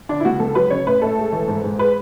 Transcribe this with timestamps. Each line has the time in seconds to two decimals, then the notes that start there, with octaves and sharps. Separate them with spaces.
0.09 D3 D4
0.20 E4
0.25 C#2 F#4
0.40 C#2 A4
0.55 F#3 B4
0.70 C#3 C#5
0.87 A2 B4
1.02 A2 A4
1.18 G#3
1.33 E3
1.48 G#2
1.64 G#2
1.79 G#3 B4